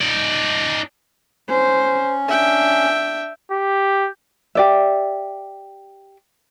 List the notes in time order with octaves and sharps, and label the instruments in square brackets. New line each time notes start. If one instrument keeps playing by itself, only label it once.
[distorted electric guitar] D#4 D5
[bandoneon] C#4 [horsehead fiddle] C5
[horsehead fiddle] D4 [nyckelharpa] E5 G5
[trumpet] G4
[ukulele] G4 D5 E5